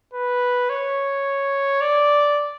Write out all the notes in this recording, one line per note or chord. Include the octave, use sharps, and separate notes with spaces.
B4
C#5
D5